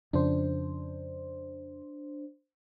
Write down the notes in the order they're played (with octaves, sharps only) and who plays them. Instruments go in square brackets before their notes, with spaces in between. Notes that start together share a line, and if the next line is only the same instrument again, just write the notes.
[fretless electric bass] F2 C#3 [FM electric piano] D4 C5